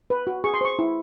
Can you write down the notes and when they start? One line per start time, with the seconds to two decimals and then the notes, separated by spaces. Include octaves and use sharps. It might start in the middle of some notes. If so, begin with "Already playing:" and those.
0.10 B4
0.27 F#4
0.44 G#4 C#6
0.54 C6
0.61 C5 C#6
0.79 E4